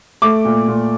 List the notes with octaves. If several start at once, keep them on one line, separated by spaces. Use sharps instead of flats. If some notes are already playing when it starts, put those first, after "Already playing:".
A3 D6
A#2
A#2